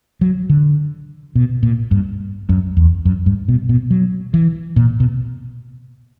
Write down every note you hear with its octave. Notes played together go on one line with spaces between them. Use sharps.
F#3
D3
B2
A#2
G2
F#2
E2
F#2
G2
B2
B2
F#3
E3
A#2
B2